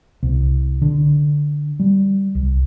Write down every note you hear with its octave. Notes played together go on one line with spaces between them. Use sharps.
C2
D3
G3
C2